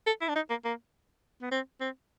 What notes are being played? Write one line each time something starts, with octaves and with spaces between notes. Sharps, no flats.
A4
E4
D4
D#4
A#3
A#3
B3
C4
C4